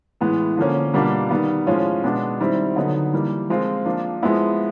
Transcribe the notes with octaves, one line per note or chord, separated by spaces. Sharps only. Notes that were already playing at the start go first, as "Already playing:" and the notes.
A2 E3 G#3 B3
D3 F3 A#3 C#4
B2 G3 A#3 D4 F4
D#3 G3 B3
A2 F3 G#3 C#4 F4
B2 G#3 B3 D4
D#3 G3 C4 E4
D3 F#3 B3 D#4
E3 G3 A#3
F3 G#3 C4 F4
F3 A#3 D4 F4
F3 G#3 B3 E4